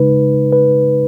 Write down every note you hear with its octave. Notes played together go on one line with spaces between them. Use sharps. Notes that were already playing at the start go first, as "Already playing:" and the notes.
Already playing: C#3 G#3 D#4 B4
B4